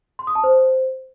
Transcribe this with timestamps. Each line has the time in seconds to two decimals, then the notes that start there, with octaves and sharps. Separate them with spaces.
0.19 C6
0.27 D#6
0.35 A5
0.44 C5